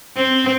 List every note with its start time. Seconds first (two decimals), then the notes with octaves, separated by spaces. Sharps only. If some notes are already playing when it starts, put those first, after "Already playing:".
0.17 C4